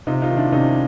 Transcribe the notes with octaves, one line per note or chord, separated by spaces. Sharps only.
C3 D#4 F4
D#4 F4
D#3
D4 E4
C3 C#4 D#4